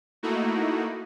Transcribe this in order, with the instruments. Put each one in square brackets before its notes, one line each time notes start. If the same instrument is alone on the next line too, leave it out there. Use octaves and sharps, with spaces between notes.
[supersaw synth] A3 A#3 D#4 E4 F#4